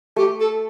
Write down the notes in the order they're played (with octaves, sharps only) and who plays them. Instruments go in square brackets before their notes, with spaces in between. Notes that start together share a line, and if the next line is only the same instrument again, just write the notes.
[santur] A3 [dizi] G4
[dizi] A4